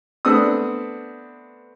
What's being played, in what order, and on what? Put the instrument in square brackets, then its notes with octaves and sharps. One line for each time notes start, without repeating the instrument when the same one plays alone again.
[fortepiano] A3 B3 C4 D4 D#6